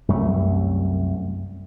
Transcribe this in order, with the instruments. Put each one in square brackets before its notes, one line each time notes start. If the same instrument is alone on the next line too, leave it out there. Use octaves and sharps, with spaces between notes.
[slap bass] C2 F#2 A3